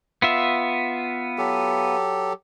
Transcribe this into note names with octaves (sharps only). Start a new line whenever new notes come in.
B3 F4 E5
F#3 G4 A4